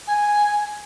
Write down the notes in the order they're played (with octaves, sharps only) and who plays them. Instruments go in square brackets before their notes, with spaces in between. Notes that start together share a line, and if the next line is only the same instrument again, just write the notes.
[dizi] G#5